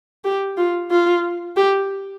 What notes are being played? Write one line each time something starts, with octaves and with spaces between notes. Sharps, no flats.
G4
F4
F4
G4